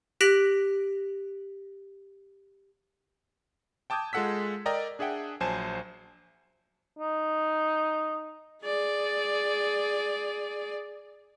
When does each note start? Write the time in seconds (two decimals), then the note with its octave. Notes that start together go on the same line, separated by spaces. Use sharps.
0.21 G4 F#6 A#6 B6 D7 F#7
3.90 G5 A5 D6 D#6 G6 G#6
4.13 G#3 F4 A4 F#5 E6 B6
4.66 A#4 D5 D#5 G5 A#5
4.99 D4 G#4 E5 F#5 G5
5.40 A#1 F#3 C5 G#5 A5 E7
6.99 D#4
8.63 G#4 D5